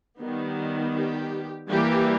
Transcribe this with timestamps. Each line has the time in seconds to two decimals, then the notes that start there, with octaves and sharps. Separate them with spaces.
0.21 D#3 G3 B3
0.96 G4
1.70 E3 G3 A#3 G4